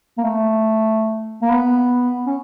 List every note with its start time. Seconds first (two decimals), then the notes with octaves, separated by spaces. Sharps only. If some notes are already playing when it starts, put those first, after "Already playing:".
0.18 A#3
0.23 A3
1.42 A#3
1.50 B3
2.26 C#4